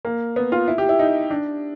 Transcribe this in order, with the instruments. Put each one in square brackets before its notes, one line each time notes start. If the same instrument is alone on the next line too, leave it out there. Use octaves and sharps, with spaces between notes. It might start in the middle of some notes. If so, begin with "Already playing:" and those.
[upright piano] A#3
B3
F4
E4
G4
E4
D#4
D4